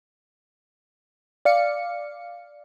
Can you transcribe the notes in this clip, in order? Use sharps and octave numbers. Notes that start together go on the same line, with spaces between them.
D5 F5 C#7